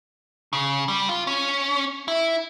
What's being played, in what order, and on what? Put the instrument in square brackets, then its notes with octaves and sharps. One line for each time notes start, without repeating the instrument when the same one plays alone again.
[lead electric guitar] C#3
G3
F4
C#4
E4